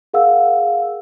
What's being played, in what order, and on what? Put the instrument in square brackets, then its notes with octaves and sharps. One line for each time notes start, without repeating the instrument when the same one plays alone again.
[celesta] G#4 A#4 F5 F#5 E6